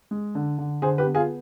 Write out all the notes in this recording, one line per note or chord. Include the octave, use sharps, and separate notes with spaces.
G#3
D3
D3
D3 G#4 C5
G4 B4
B3
F4 G#4